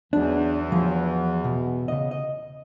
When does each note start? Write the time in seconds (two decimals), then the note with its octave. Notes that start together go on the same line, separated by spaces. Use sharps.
0.13 E2 E3 F#3 D4
0.72 F3 F#3
1.44 B2
1.88 C#3 D#5
2.11 D#5